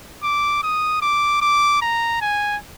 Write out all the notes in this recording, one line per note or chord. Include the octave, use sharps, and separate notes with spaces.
D6
D#6
D6
D6
A#5
G#5